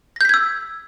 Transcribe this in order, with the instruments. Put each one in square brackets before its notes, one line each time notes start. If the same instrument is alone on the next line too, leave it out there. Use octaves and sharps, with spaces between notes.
[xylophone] A#6
G6
B6
G#6
E6